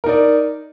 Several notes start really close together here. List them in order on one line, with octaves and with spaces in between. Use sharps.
A#4 D#4 D5